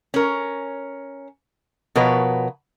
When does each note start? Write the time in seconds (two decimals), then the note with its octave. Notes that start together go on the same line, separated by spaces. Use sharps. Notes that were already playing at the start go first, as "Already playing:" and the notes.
0.14 C#4 A#4
1.95 B2 F3 A#4 B4 C#5